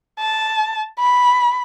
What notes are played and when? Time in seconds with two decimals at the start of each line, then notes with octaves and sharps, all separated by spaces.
0.19 A5
0.99 B5